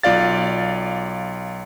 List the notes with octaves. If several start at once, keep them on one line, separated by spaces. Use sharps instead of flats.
B1 F4 D5 F5 A6